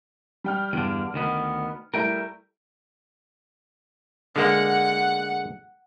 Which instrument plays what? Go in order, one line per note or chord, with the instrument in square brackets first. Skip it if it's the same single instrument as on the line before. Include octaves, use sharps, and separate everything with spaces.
[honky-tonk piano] G3 G5 F6
[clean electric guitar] E2 G2 D3 [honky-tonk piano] D7
[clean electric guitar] D2 D#3 B3
[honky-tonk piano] G3 A3 E4 [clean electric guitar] A#4 G5
[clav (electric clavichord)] D3 G#3 A#3 [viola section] F#5